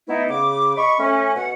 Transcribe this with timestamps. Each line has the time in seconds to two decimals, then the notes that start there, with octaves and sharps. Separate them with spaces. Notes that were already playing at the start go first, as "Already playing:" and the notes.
0.09 E3 A3 B3 D#4 E4
0.29 C#3 D6
0.77 D#5 B5 C#6
0.99 A3 C#4
1.36 B2 F#5